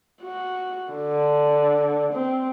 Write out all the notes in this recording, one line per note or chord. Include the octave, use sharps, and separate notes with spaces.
F#4
D3
C4